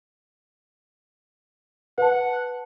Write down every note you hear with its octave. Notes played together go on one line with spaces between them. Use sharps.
B4 F#5 A5